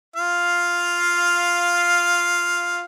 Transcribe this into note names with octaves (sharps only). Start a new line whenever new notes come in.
F4 F5